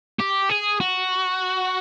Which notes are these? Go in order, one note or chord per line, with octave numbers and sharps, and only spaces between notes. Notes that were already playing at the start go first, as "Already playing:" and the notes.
G4
G#4
F#4